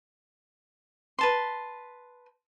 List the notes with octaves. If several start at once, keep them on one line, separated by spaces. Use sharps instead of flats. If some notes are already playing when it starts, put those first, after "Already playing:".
B4 A5 C6